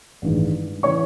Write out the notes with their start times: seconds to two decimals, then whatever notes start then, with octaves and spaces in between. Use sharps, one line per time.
0.22 A1 G2 D#3 G#3
0.83 C#3 E3 C#5 C#6